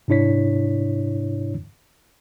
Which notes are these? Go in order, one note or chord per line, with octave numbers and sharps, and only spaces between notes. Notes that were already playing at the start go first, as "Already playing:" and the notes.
G#2 C3 D4 E4 C#5 B6